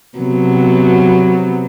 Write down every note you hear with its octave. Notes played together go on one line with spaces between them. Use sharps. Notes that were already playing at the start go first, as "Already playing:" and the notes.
C3 F#3 B3